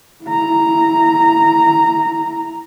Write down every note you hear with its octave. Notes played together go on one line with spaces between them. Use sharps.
E4 A#5